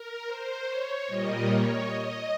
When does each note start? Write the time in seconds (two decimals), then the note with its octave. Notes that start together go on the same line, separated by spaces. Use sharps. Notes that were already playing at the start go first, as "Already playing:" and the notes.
Already playing: A#4
0.26 C5
0.67 C#5
1.07 A#2 G3 A#3 D#5
1.47 C#5
1.86 D#5